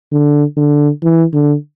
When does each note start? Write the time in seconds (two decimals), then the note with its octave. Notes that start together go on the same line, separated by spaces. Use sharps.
0.12 D3
0.57 D3
1.03 E3
1.33 D3